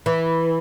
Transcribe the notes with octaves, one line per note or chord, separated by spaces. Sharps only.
E3